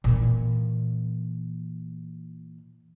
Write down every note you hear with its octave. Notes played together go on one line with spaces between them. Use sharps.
A#2 E3